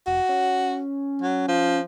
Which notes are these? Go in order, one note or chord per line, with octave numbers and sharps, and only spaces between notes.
F1 F#4
C#4
F#3
F3